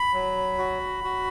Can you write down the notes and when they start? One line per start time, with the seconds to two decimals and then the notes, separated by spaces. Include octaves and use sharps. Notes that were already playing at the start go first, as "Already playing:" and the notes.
Already playing: B5
0.14 F#3
0.58 F#4
1.04 F#4